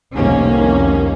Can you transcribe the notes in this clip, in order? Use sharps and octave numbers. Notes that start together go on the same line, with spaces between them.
F1 C2 D#3 A#3 C#4